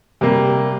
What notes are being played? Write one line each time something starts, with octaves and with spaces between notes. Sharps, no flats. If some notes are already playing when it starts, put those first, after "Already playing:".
C3 G3 A#3